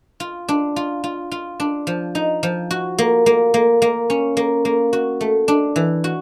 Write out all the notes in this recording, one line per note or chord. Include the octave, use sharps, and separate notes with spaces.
F4
D4
F4
F4
F4
D4
F3
D#4
F3
F#4
A#3
A#3
A#3
A#3
C#4
A#3
A#3
F#4
A3
D4
E3
F#4